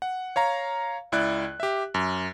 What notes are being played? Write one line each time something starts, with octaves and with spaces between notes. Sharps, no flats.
F#5
C#5 F5 A#5
C#2 E4 D5 F#6
G4 E5
F#2